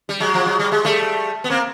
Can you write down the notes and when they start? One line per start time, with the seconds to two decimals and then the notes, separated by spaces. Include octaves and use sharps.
0.09 G3
0.20 F#3 G#3
0.34 F3
0.46 F#3
0.59 G3
0.72 G#3
0.85 G3 A3
1.44 B3
1.50 A#3 C4